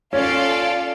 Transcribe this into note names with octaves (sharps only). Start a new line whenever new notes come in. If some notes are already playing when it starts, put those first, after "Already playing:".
C#4 F4 A4 D5 F5